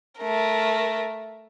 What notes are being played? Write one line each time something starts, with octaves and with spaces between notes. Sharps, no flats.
A3 A#4